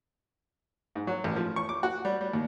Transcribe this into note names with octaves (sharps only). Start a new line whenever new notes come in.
G#2
F#3
A1
F3
C#6
D6
F#4
G3
G3
D#2